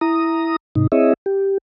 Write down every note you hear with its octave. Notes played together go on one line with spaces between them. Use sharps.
E4 A#5 D#6
G#2 C3 D#4
C4 E4 G#4 C#5 D#5 E5
G4